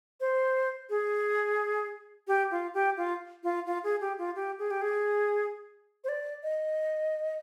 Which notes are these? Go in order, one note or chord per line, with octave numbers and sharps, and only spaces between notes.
C5
G#4
G4
F4
G4
F4
F4
F4
G#4
G4
F4
G4
G#4
G4
G#4
C5
D5
D#5